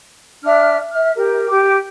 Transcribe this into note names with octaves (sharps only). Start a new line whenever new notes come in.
D4 E5 F6
E5 F6
G4 A#4
G4 D6